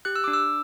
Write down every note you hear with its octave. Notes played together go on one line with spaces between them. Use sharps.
G4 F#6
E6
D4 D6
E6